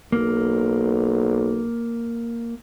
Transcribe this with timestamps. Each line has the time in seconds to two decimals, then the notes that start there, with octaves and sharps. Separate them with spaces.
0.12 B1 A#3